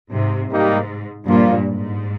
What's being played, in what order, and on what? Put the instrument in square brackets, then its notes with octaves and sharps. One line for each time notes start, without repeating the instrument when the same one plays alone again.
[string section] G#2 C3
[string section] G#2 [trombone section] G3 A#3 D#4 G4
[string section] G2 A#2 [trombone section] F3 A#3 F4
[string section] G#2